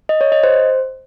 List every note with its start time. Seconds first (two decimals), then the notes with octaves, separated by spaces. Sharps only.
0.09 D#5
0.21 C#5
0.32 D#5
0.44 C5